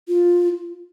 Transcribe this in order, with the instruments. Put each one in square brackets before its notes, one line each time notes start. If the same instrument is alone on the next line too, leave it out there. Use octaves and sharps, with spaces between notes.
[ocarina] F4